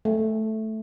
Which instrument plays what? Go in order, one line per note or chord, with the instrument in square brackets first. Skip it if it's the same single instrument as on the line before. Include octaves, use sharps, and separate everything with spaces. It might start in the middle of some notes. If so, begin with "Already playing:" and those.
[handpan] A3